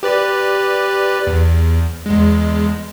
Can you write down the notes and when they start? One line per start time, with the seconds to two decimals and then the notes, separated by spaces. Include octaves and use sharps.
0.03 G4 B4 D5
1.27 E2
2.06 E2 G#3